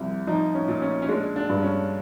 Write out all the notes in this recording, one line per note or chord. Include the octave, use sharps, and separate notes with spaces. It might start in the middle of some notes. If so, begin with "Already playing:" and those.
Already playing: C2 F3
F3 D#4
C#4
A#2
C#4
C#4
G#3 D4
D4
G2
C#4